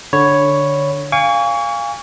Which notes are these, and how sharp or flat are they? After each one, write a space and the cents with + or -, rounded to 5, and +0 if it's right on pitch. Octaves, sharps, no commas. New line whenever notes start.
D3 +0 C#5 +0 B5 +0
F5 +0 G#5 -30 C#6 +30